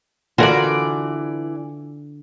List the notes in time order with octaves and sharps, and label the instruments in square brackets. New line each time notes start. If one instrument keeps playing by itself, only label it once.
[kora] D3 F4 [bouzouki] E3 D5 [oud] F#4 A#4